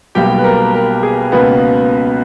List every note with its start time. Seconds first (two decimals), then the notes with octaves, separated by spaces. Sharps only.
0.15 B1 B2 G3 A#3 G4 G5
0.38 B4
0.44 A#4
0.74 A#4
1.03 G#4
1.32 C#2 B2 A#3 B3 B4